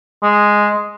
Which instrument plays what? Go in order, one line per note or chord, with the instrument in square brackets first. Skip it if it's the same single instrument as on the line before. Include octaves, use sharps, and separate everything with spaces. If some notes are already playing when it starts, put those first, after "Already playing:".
[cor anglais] G#3